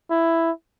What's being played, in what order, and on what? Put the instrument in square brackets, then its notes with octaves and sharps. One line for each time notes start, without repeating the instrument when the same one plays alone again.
[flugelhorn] E4